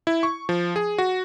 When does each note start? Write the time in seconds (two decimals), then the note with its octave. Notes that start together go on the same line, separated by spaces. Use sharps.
0.07 E4
0.23 C#6
0.49 F3
0.76 G#4
0.98 F#4